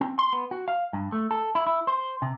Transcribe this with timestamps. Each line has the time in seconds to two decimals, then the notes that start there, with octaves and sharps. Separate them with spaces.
0.01 C4
0.19 C6
0.33 B3
0.51 F#4
0.68 F5
0.93 G2
1.12 A3
1.31 A4
1.55 E4
1.67 E4
1.87 C5
2.22 C3